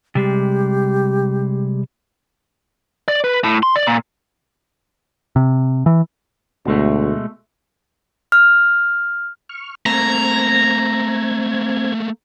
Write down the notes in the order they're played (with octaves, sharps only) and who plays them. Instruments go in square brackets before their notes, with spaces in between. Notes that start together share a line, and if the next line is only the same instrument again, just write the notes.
[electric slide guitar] C3 G3 G#3 [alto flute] G4
[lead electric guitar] D5
B4
A2
C6
D5
A#2
[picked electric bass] C3
E3
[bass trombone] D2 [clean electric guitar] B2 G#3 A3
[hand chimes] F6
[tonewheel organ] C#6 F6
[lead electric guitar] A3 A#3 [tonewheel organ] C4 G#6 [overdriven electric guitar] A#5